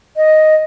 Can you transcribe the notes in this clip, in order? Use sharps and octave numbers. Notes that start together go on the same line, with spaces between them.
D#5